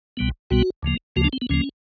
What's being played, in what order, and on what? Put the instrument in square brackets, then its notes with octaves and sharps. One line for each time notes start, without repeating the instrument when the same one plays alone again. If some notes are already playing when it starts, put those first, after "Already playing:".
[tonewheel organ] C2 B2 G3 B3
C2 B2 G3 B3 F#4
D2 C#3 F3 A#3
D2 C#3 F3 A#3 F#4
D4
C4
B3
D2 C#3 F3 A#3 C#4